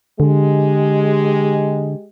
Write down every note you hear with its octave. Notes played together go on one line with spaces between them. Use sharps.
D3 G#3 G4